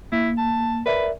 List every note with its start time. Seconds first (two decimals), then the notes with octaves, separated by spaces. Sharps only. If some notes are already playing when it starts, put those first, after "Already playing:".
0.12 A#3 E4
0.38 A5
0.86 A#4 B4 D5 E5